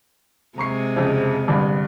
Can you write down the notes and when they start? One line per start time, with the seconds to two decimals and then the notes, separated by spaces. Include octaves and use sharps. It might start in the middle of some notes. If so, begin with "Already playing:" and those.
0.58 C3 G#3 A#5 C#6 C7
0.96 F2 C#3
1.48 G1 G2